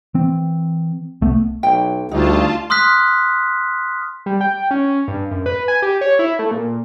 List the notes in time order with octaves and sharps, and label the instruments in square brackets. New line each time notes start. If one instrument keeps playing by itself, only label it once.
[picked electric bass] E3 C4
C2 A3 B3
[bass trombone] B1 [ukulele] G5
[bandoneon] D2 [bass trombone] G3 [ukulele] D#4 [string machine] F4 A5
[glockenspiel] C6 D#6 F6 F#6 B6
[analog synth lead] G3
G5
C#4
G2
F#2
B4
G#5
G4
C#5
E4
A3
A#2